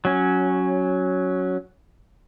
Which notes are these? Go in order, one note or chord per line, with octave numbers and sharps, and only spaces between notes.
F#3 C#4